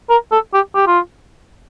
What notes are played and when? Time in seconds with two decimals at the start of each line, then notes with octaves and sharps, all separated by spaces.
0.10 A#4
0.32 A4
0.54 G4
0.75 G4
0.87 F4